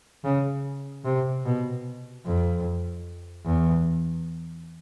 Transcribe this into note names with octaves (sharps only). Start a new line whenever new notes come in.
C#3
C3
B2
F2
E2